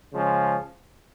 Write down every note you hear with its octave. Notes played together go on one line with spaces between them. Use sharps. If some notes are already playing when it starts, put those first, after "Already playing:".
C#3 F3 G#3 C#4